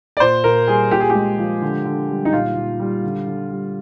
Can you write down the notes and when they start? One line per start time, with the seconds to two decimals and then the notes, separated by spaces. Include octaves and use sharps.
0.17 D5
0.20 A#2 C5
0.44 A#2 A#4
0.68 G3 G#4
0.91 A#2 G4
1.00 G#4
1.10 G4
1.15 G#3
1.38 F3
1.62 D3
1.85 D3
2.09 G3
2.25 D#4
2.32 A#2 F4
2.56 A#2
2.80 G3
3.03 D3
3.27 D3
3.51 G3